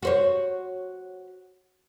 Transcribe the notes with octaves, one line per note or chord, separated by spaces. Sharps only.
F#4 C5 C#5